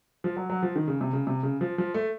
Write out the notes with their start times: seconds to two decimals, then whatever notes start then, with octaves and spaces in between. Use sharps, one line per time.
0.24 F3
0.36 F#3
0.50 F#3
0.63 F3
0.76 D#3
0.88 C#3
1.01 C3
1.13 C#3
1.27 C3
1.43 C#3
1.61 F3
1.78 F3
1.94 A3